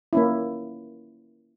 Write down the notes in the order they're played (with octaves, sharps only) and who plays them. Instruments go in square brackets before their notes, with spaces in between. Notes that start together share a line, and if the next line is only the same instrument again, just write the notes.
[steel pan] A#3 C#4 E4